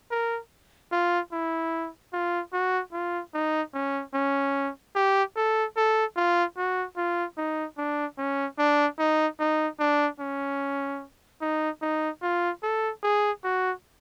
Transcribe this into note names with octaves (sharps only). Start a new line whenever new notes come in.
A#4
F4
E4
F4
F#4
F4
D#4
C#4
C#4
G4
A4
A4
F4
F#4
F4
D#4
D4
C#4
D4
D#4
D#4
D4
C#4
D#4
D#4
F4
A4
G#4
F#4